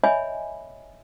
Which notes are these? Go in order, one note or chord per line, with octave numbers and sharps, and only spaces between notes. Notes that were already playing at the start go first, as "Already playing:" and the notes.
C#5 D#5 E5 G#5 B5